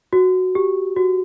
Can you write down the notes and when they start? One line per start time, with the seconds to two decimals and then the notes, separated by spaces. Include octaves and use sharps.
0.13 F#4
0.55 G4
0.96 F#4